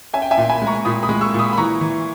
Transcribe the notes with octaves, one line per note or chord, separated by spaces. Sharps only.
C#4 E5 G#5
G5
E5 G#5
A#2
G#5 B5
G#3
A#5 C#6
A#2 B5 D#6
B5 D#6
G#3
C#6 E6
A#2
B5 D#6
B5
E3 A#5 C#6
E3